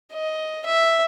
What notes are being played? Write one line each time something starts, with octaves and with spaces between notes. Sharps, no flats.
D#5
E5